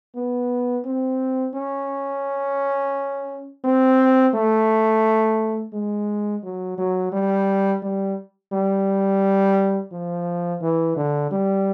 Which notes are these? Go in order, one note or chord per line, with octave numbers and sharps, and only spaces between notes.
B3
C4
C#4
C4
A3
G#3
F#3
F#3
G3
G3
G3
F3
E3
D3
G3